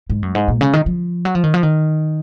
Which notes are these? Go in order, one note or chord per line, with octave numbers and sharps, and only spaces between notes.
G#2
F#2
G#2
A#2
C#3
D#3
F3
F#3
F3
D#3
F3
D#3